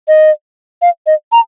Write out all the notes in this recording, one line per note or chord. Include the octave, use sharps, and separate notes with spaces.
D#5
F5
D#5
A#5